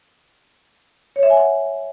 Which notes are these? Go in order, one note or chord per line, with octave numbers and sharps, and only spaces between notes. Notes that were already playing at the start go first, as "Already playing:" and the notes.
C#5
E5
G#5
F#5